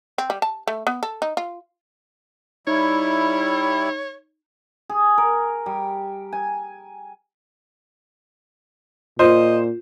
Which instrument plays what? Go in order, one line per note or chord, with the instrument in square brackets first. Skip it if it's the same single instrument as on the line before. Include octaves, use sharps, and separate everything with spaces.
[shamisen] C4
G3
A5
A3
B3
A4
D#4
F4
[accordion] G3 E4 [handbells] D#4 [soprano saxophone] C#5
[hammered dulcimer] G#4
A#4
G3
G#5
[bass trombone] A#2 [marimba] F4 [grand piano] C5 [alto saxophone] D#5